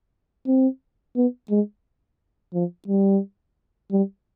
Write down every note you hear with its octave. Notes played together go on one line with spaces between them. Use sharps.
C4
B3
G#3
F3
G3
G3